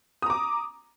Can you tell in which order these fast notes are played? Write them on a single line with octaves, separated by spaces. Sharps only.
D#6 A#5 D6